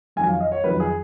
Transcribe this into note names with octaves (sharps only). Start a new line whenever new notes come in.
F2 D#3 F#3 G#5
F5
D#5
C#5
F2 D#3 F#3 B4
G#4